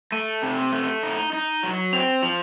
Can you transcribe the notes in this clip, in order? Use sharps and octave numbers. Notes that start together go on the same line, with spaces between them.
A3 D#7
C3
A3
D#4
D#4
F#3
C4 F7
F3 F7